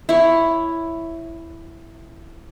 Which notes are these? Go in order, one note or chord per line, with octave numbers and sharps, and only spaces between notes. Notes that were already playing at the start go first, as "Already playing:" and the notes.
E4 C#5